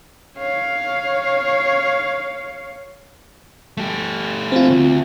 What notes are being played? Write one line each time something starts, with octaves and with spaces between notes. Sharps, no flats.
C#5 F5
A3 G4
C4 F4
D2